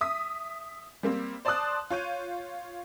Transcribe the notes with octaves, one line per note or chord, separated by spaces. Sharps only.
E5 D#6 B6
G3 A#3 C4
C5 D5 A5 C6 D#6 F#6
F4 C#5 G6 D#7